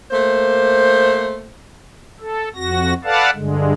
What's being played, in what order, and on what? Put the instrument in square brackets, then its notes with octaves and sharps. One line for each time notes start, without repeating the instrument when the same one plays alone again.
[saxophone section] A3 A#3 C5
[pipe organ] A4
F2 F#4 A#6
A4 B4 D5 F5 F#5 A5
G2 D3 G#3